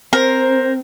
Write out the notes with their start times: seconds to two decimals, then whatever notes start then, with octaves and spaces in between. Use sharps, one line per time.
0.13 C4 A#4 C5